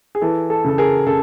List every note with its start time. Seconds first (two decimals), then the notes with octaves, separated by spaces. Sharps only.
0.15 G#4
0.22 E3 A4
0.50 A4
0.64 C#3 A4
0.78 G#4 A#4
1.07 C#3 A4